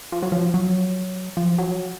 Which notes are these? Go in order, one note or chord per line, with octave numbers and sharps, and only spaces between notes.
F3
F#3
F3
F#3
F3
F#3